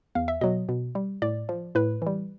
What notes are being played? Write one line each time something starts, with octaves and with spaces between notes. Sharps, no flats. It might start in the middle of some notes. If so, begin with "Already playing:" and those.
E2 F5
E5
B2 F#3 D#5
B2
G3
A2 D5
F3
A2 B4
E3 G3